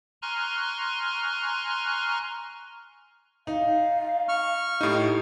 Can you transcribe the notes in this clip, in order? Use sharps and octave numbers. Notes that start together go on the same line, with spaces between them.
G#5 A#5 C6 C#6 F6 F#6
D#4 F5
C#6 F6
A2 D#4 G4